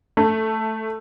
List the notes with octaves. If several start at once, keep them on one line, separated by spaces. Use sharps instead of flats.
A3